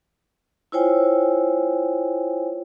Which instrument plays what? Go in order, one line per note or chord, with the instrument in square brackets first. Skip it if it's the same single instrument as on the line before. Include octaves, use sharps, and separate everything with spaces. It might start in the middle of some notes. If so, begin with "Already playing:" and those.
[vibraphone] E4 F4 C5 C#5 G5 G#5